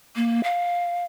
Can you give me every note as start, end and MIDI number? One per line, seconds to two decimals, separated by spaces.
0.16 0.41 58
0.44 1.05 77